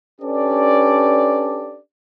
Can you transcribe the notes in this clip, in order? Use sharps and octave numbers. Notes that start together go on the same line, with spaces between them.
C#4 D4 G4 A4 B4 D5